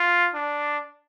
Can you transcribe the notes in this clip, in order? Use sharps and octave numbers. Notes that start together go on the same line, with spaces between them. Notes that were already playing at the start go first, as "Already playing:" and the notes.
Already playing: F4
D4